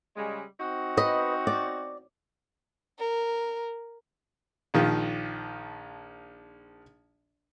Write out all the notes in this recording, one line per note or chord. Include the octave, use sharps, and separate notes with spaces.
C#3 G3 G#3
C4 D#4 F#4
B4 D#5
D5
A#4
A#1 D#3 F3